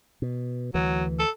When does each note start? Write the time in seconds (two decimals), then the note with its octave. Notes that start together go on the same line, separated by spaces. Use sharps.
0.22 B2
0.74 D2 E3 F#3
1.19 A4